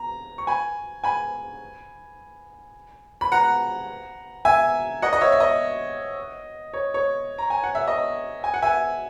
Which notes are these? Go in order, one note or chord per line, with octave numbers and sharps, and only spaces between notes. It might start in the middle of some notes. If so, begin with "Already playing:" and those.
Already playing: A#5
C#6
G#5 B5
G#5 B5
B5
F#5 A#5
E5 G#5
D#5 F#5
D#5
C#5 E5
E5
D#5
C#5
C#5
A#5
G#5
F#5
E5
D#5
G#5
F#5
E5 G#5